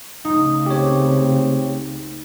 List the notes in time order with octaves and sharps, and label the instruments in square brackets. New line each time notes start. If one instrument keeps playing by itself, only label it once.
[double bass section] C#2 C#3 A3 [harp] D#4
[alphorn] C4 [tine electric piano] G4 C#5